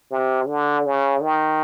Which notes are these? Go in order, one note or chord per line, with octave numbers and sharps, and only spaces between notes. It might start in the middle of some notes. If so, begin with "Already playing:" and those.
C3
D3
C#3
D#3